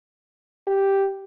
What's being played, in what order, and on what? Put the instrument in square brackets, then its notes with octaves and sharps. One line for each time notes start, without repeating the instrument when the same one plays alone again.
[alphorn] G4